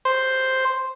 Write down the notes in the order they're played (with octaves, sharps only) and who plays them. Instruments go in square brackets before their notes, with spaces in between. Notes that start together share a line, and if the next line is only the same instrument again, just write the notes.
[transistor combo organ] C5